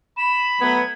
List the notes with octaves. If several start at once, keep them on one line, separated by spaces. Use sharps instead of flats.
B5 E7
F#3 A3 B3 G#6